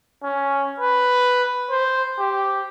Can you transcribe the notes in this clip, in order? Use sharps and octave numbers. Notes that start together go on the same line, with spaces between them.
C#4
B4
C5
G4